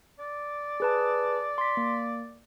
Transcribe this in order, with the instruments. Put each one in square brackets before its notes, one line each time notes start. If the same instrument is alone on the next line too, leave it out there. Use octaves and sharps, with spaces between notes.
[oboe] D5
[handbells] G#4 B4 A5
C6 B6
A#3